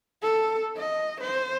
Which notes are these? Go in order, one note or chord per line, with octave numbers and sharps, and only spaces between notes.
A4
D#5
C5